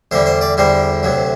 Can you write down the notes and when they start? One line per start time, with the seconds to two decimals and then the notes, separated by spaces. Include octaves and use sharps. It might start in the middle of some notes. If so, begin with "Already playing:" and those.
0.11 E2 D3 G3 C5
0.26 C5
0.41 D5
0.57 E2 D3 G3 C5
1.03 D2 C3 F#3